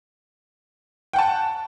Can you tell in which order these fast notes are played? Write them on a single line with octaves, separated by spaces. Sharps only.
G5 F#5 A5